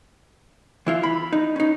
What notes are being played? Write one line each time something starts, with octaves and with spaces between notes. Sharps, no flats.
E3 E4 F4
B5
D#4
C#4 D#4